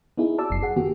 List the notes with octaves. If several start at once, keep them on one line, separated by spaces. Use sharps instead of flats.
B3 D#4 E4 G#4
F#4 D5 A5 D6 E6
G1 F#2 C7
G#4 F#5
D#3 A#3 B3 F#4 G4